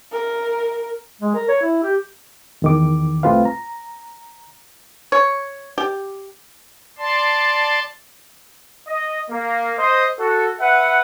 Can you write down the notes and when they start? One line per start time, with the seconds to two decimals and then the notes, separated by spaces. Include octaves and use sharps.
0.12 A#4
1.21 G#3
1.35 A#4
1.49 C#5
1.62 E4
1.83 G4
2.62 E2 D#3 D6
3.23 C2 A3 C4 F4 B4 F5
3.45 A#5
5.12 C#5
5.78 G4
6.98 D5 A5 C6
8.88 D#5
9.31 A#3
9.79 C5 D#5
10.19 F#4 A4
10.60 B4 E5 F#5